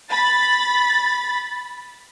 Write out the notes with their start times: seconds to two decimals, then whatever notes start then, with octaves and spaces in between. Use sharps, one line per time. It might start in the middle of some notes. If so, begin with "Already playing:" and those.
0.10 B5 A6